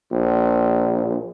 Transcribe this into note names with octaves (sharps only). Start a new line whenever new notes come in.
A#1